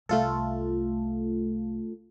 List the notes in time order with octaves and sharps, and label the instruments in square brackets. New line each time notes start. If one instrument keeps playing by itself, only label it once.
[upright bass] C2 [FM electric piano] A3 F4 A4